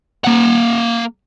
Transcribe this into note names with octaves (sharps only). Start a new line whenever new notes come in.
A#3 F#5